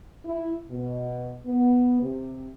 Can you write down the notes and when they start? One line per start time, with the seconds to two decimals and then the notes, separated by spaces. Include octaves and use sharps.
0.25 E4
0.70 B2
1.46 B3
2.02 C3